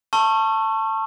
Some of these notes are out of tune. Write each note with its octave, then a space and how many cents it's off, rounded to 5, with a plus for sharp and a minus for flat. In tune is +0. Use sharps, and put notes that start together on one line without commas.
A5 +15 C#6 -20 E6 +40